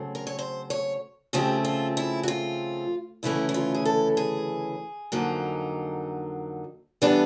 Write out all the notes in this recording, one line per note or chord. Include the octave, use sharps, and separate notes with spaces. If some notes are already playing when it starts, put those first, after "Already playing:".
Already playing: C#3 F#3 A3 C4
A#4
C#5
C5
C#5
C#3 F3 A3 C4 G4
F4
E4
F#4
F4
D2 C#3 E3 A3 C#4 E4
E4
F4
G#4
A4
G#4
F2 D3 F#3 A#3 D#4
E3 G3 B3 D4 A4